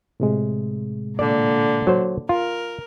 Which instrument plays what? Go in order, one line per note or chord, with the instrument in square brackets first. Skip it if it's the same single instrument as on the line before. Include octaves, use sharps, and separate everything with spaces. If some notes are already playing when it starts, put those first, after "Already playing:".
[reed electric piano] A2 C3 G#3
[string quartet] A#2 D3 [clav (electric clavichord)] D5
[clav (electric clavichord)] F#3 C5
[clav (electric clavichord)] F4 [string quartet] A#4